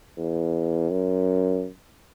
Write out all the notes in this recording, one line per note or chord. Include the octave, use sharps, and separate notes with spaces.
E2
F#2